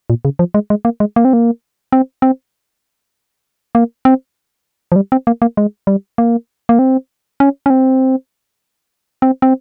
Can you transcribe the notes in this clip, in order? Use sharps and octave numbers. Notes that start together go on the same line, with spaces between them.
A#2
C#3
F3
G#3
G#3
A#3
G#3
A#3
C4
A#3
C4
C4
A#3
C4
F3
G3
C4
A#3
A#3
G#3
G3
A#3
A#3
C4
C#4
C#4
C4
C4
C4